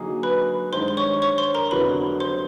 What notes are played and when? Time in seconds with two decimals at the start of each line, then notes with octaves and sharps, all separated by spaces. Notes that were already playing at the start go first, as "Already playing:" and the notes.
Already playing: D3 F#3 A#3 D#4 G#4
0.23 B4 B5
0.73 G2 D#3 G#3 C5 C6
0.88 C6
0.97 C#5 C#6
1.22 C#5 C#6
1.38 C5 C6
1.54 A#4 A#5
1.71 F1 F2 D3 F#3 B3 B4 B5
2.20 C5 C6